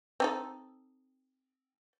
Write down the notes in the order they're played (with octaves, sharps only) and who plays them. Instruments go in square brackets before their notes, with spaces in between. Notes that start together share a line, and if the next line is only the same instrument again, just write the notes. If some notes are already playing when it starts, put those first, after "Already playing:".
[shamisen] C4 D#4 A4